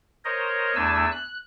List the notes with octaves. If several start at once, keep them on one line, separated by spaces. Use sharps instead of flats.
A#4 C5 C#5 D#5
E2 A3 D4 G#5 A5 E6
F#6